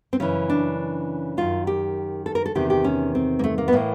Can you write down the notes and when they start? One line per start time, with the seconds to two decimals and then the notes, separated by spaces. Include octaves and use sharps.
0.13 C4
0.20 F#2 C#3 E3 C#4
0.50 D4
1.37 F#2 D#3 F4
1.67 G4
2.26 A4
2.35 A#4
2.46 A4
2.55 E2 C3 D#3 G4
2.70 G4
2.84 C#4
3.15 C4
3.39 A#3
3.44 A3
3.58 A#3
3.68 B3
3.73 A2 E3 A#3